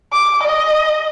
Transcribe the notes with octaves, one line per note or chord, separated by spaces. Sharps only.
D6
D#5